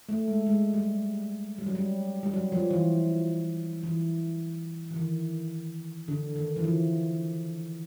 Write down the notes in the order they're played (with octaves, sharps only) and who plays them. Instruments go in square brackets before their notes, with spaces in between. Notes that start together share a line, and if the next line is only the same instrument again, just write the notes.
[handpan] A3
G#3
G#3
G3
G3
F#3
G3
G3
F#3
F3
E3
E3
E3
D#3
D3
D#3
E3
F3